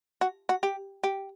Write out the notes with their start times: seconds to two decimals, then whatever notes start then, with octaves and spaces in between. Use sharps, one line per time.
0.21 F#4
0.49 F#4
0.63 G4
1.03 G4